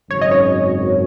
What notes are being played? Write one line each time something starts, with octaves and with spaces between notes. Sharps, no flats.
G#1 F#2 C#3 C#5
D#5
C#5